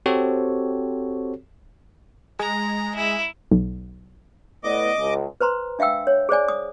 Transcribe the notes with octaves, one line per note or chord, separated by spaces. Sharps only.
C4 F#4 G4 A4 C5 C#5
G#3 A#5
E4
B1
A2 B3 D5 D#5 D6
C#2
B4 C5 A#5 C6
D4 E5 F5 G5 E6
C#5
G#4 C5 D5 G#5
D#6